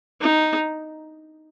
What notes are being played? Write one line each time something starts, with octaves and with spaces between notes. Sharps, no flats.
D#4